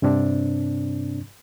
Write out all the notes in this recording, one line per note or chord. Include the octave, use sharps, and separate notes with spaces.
G2 C3 C4 D4